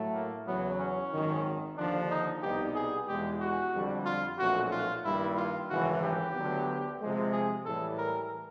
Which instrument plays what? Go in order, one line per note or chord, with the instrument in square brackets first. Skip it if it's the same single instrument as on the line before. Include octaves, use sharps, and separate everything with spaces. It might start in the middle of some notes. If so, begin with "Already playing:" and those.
Already playing: [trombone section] A2 F#3 A3
[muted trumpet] A#3
[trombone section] E2 C#3 F#3 [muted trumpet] B3
[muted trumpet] C#4
[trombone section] G#1 F#2 D#3
[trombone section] D#2 D3 F3 [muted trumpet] D4
[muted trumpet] D#4
[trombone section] C2 B2 G3 B3 D#4 [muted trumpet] G4
[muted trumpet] G#4
[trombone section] E2 B2 G#3 [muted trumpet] G4
[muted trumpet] F#4
[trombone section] F2 D3 G3
[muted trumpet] F4
[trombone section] B1 A#2 F3 A3 C#4 [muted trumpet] F#4
[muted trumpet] F4
[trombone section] G2 D#3 G3 A#3 [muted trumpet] E4
[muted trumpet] F4
[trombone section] G#1 F#2 C#3 E3 [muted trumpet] F#4
[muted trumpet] G4
[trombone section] D2 D3 F#3 B3
C3 F3 G#3
[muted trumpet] G#4
[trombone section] A2 E3 G3 [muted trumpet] A4
[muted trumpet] A#4